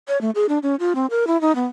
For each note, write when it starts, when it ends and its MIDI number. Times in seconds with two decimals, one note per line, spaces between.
0.08 0.20 73
0.21 0.30 57
0.35 0.46 68
0.49 0.58 62
0.63 0.75 61
0.79 0.93 65
0.95 1.06 60
1.10 1.27 70
1.27 1.40 64
1.41 1.54 63
1.55 1.66 59